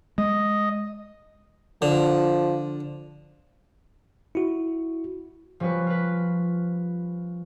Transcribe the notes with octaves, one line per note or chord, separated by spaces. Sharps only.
G#3 D#5
D3 F3
E4 F#4
F3 G3 C#4 F#4 B4
F4 B4